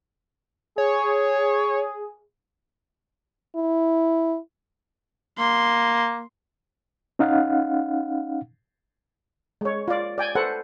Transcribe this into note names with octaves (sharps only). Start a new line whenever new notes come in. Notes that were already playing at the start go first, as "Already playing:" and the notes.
G#4 C#5
E4
A#3 C6
C#4 D#4 F5 F#5
G#3 C#5
F4 D5
D5 G5 G#5
A4 B4 C5 F#5